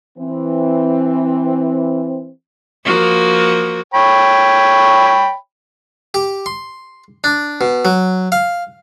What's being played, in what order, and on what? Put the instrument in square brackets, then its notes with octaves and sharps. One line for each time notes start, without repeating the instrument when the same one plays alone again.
[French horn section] E3 C4
[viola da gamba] F3 A#3 F#4
[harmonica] C#5 G5 B5
[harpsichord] G4
C6
D4
B2
F#3
F5